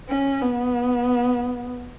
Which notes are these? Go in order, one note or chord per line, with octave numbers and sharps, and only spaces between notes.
C#4
B3